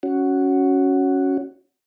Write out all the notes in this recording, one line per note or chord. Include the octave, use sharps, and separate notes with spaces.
C#4 F#4